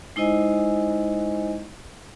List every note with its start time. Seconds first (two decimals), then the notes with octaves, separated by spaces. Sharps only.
0.16 G#3 D#4 E4 C5 D#5 G#5